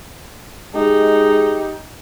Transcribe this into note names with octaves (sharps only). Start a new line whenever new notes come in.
G#3 D#4 G4